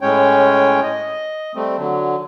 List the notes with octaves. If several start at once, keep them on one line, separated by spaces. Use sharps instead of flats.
A2 G#3 C#4 C#5 G5
D#5
G3 A3 C4
D3 F#3